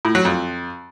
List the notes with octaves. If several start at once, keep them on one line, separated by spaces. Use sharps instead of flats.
A2
F#3
F2